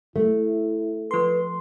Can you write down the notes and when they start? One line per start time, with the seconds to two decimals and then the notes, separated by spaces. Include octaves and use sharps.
0.16 A3 E4
1.11 F3 B4 C6